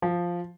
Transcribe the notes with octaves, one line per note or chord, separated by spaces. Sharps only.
F3